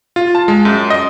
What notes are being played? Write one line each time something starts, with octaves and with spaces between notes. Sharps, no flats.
F4
A5
G#3
F#2
D#5